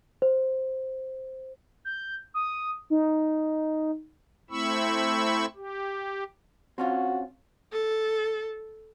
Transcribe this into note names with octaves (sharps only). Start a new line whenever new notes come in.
C5
G6
D#6
D#4
A3 C4 E4 B5 C#6 E6
G4
C4 C#4 F4 F#4
A4